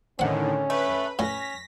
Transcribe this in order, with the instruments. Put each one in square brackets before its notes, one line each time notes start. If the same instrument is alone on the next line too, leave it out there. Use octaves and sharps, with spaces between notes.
[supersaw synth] A2 D3 D#3 [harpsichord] C4 F#5 [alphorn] C#4
[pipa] A3 [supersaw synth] B4 B5
[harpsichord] A2 [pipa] C#4 [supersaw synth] A#6 B6